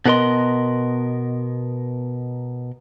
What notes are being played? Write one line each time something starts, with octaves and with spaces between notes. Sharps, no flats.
B2 B3 F4 A#4 D#5 C6